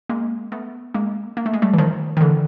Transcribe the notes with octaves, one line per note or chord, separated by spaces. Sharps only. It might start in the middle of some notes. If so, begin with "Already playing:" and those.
G#3 A#3
A3 B3
G#3 A#3
A#3
A3
G#3
G3 A3
E3
D#3 F3
D#3
D3 E3